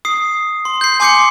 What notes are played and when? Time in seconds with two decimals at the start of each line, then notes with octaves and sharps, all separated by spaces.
0.05 D#6 C7
0.65 C6
0.81 G6 C7
1.00 G#5 C6 D6 G6 C7 C#7